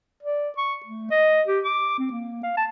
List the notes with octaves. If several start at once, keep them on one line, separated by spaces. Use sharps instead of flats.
D5
C#6
A3
D#5
G4
D6
C4
A#3
F5
A5